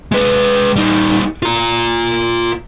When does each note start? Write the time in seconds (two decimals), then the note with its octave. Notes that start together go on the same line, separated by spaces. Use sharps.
0.12 G#3 B4
0.76 G3 D#4
1.43 F4 A#5